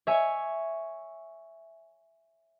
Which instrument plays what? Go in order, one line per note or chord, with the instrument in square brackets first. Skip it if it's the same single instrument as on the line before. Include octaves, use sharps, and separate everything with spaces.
[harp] C#5 E5 G#5